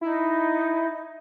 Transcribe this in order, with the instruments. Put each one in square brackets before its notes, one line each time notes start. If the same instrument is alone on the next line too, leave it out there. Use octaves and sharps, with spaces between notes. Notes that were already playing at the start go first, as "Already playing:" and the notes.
[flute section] D#4 [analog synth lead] E4